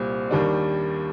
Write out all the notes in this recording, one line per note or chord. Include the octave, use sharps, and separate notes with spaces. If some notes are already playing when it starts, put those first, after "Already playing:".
Already playing: C2 A#2 G3 C4
D#2 D#3 G3 D4